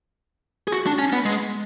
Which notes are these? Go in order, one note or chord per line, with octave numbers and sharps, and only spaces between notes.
G#4
F#4
D4
C#4
B3
G#3